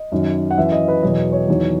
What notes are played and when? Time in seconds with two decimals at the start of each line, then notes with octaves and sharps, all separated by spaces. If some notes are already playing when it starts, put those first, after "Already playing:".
Already playing: D#5
0.12 F#2 D#3 F#3
0.51 F#5
0.58 F#2 E3 E5
0.72 D#5
0.88 B4
1.03 E2 B2 F#3 D#5
1.32 C#5
1.48 E2 D#3 F#3